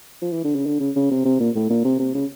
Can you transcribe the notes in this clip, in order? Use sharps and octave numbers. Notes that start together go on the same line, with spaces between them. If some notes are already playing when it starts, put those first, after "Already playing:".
F3
E3
D3
C#3
D3
C#3
C#3
C3
C3
A#2
A2
A#2
C3
C3
C#3